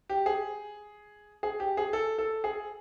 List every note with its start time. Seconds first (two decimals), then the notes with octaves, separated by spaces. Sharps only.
0.09 G4
0.26 G#4
1.43 G#4
1.60 G4
1.77 G#4
1.93 A4
2.18 A4
2.44 G#4